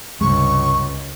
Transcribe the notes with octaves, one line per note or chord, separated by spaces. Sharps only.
C#2 G2 C3 G#3 C#6